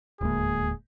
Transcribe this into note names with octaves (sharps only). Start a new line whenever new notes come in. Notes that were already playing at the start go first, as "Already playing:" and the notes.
D#1 D2 A2 G#3 A#3 G#4